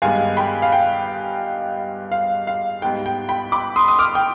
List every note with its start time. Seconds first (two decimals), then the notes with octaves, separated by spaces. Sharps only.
0.02 G2 D#3 G#3 B3 F5 G#5
0.37 G5 B5
0.62 F5
0.72 G5
2.12 F5
2.47 F5
2.82 G#2 G3 B3 G5
3.06 G5
3.29 G5 B5
3.52 B5 D6
3.76 C6 D#6
3.88 D#6
3.99 D6 F6
4.15 G5